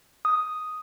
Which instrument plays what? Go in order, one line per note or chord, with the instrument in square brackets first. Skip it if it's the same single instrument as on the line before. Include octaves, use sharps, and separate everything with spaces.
[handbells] D#6